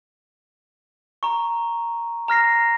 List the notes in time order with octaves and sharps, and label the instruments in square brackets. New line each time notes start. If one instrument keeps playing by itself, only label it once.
[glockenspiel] A#5 C#6
A#5 F6 A#6 C7